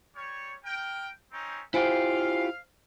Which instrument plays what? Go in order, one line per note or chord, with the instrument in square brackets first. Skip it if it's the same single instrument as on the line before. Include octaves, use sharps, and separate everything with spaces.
[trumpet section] G3 C#5
A#4 G5
C4 C#4 D#4
[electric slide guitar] E4 F4 G4 [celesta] C5 G#5 D7 [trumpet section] F5